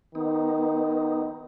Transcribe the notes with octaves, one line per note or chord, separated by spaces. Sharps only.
D#3 B3 D#4